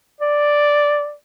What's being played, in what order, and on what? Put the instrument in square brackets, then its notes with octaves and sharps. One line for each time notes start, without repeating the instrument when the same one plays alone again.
[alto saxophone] D5